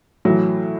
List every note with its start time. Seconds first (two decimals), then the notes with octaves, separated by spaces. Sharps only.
0.25 A2 E3 F#3